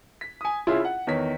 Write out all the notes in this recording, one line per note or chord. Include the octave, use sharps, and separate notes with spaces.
B6
G#5 D#6
C2 C#4 E4 F4 G#4 C6
F#5
E2 D#3 C#5 B6